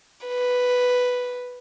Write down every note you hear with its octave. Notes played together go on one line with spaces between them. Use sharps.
B4